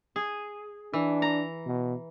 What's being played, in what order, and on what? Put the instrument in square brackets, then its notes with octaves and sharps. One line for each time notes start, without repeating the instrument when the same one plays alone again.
[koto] G#4
[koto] E3 [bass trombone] D4
[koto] A#5
[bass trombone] B2